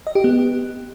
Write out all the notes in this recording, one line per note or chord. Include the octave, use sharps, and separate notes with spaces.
D#5
G4
B3